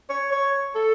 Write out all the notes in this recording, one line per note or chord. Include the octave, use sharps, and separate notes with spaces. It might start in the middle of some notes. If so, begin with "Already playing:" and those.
C#5
C#5
A4